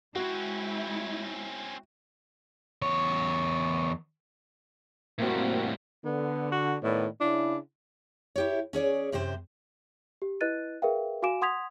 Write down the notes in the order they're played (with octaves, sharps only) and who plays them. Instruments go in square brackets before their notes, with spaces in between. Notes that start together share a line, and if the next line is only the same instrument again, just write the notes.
[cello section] G#3 E4 [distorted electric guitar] C4 C#4 [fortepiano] F#4
[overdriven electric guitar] E2 C#5
[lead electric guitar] A2 G3 [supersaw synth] A#3 C4 F#4
[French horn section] D3 [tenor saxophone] B3
[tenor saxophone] F#4
[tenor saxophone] A2 [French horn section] D#3 B3 D5
[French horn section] C#3 E4 [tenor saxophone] D4
[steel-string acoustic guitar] E4 G4 C#5
C#4 G#4 C#5 D5
F#2 C3 G4 C5
[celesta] G4
E4 B4 D#5 F#6 A6 D#7
G#4 A#4 B4 E5 F5 G5
F#4 F5 G#5 D6 D7 E7
F#5 C6 D#6 G#6 B6 F7